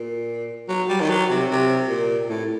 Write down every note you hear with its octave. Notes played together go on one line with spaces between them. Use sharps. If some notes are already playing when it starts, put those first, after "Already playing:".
Already playing: A#2
F#3
G3
D#3
F#3
C3
C3
A#2
A2